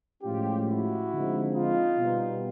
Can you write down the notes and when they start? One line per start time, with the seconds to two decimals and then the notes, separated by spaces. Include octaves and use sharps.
0.23 A2 F3 G#3 C#4 F4 G4
0.67 E4 F#4
1.11 D3 F3 G#3 C4 D#4
1.54 D#4 F4
1.98 B2 G3 B3 D#4